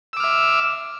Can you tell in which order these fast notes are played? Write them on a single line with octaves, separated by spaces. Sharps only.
E6 D6 F6 E5